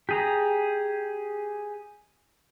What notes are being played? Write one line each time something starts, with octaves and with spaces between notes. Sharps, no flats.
G4 G#4 A#5